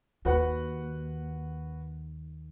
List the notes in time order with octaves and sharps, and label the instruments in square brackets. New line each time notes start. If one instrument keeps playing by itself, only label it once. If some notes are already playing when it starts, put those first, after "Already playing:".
[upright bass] D#2 [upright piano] F#4 B4 F#5